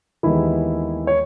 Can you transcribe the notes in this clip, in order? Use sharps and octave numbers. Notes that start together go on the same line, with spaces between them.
D#2 D#3 E3 G#3 B3 E4
C#5